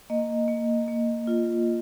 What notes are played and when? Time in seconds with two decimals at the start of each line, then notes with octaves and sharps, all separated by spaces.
0.10 A#3 D#5
0.48 A#3
0.88 A#3
1.27 F4